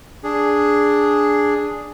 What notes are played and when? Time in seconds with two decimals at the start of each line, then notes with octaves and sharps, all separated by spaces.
0.24 D4 G#4